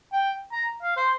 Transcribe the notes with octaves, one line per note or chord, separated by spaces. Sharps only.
G5
A#5
F5
C5